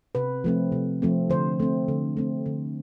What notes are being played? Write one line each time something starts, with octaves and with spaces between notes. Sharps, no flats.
C3 B4
F3 A3 C4
C3
F3 A3 C4
D3 C5
A3 C4
D3
A3 C4
D3